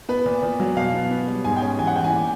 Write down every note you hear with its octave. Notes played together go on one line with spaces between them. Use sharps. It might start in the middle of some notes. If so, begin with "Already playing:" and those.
B3 B4
A#2
A#2
F#3
B2 F5
B3
B3
G3
G#2 G#5
G5
C#4 G#5
E3 G#5
F#5
E3 G5
G#5
A#2